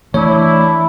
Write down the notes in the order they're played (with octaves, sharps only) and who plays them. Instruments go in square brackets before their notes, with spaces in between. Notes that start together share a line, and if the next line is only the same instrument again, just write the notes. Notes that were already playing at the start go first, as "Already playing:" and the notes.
[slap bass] E3 A3 [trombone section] D4 E4 [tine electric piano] C#5